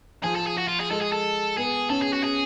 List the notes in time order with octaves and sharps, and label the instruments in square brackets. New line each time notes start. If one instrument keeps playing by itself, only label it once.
[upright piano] F3 [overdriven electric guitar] G#4
[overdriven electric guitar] A4
G#4
F#4
F4
G#4
[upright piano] G#3 [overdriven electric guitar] A4
[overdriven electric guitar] G#4
A4
[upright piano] B3 [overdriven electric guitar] G#4
[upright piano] C#4 [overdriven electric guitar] A4
[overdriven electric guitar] G#4
F#4
G#4